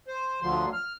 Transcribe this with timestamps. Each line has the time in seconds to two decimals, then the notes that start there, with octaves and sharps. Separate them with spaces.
0.08 C5
0.42 D2 D3 F3 F#3 C6
0.73 F6